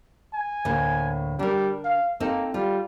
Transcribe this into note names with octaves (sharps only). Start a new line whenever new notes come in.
G#5
D2 A2 A#3
G3 D4 A#4
F5
A#3 C4 D#4 A4
G3 F4